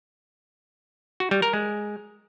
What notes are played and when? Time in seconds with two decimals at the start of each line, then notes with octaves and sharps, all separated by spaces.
1.20 F#4
1.31 G3
1.42 A#4
1.53 G#3